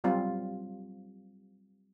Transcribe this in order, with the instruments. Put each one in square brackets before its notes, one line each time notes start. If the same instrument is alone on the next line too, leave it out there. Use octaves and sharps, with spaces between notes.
[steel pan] F#3 G3 C4 F4